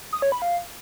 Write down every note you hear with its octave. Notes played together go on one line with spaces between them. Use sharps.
D#6
C#5
B5
F5